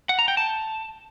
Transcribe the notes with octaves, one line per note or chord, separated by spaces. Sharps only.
F#5
A#5
G5
A5